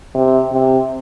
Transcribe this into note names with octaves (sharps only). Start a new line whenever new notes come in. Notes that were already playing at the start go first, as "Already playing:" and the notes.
C3
C3